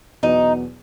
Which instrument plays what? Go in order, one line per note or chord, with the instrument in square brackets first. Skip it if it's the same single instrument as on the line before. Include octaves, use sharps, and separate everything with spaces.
[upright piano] E2 B2 F#3 B3 [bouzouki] D#4